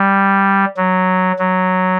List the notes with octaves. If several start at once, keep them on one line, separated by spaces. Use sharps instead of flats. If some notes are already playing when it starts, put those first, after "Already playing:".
Already playing: G3
F#3
F#3